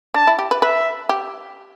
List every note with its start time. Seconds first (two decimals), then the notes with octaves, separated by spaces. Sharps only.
0.14 D4 A5
0.27 E4
0.39 G4
0.51 B4
0.62 B4 E5
1.09 G4